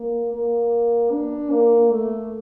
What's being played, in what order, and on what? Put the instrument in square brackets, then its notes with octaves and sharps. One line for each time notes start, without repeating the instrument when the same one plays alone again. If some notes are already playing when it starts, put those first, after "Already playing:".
Already playing: [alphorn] A#3
A#3
D4
A#3
A3